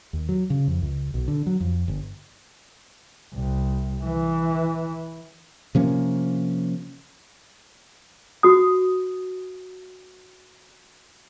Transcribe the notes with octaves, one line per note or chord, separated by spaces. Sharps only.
D#2
F#3
C#3
F2
C#2
B1
D3
F#3
F2
G1
C2
E3
C3 F3 A#3 C#4
F#4 D#6